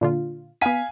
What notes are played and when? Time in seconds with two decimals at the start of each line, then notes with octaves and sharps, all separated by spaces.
0.01 A#2 D3 F4
0.62 B3 F5 G#5 B6 D#7